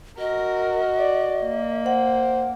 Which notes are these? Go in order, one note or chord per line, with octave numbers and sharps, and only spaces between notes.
F#4 A#4 D#5
D5
A#3
C5 F#5